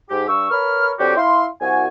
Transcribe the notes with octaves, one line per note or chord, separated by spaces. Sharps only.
G#2 G4
G2 C#6 E6
A#4 B4 C#5 B5 F6
D3 F#3 C4 D4 F#4 G4
E4 F5 C6
C2 F#4 G#5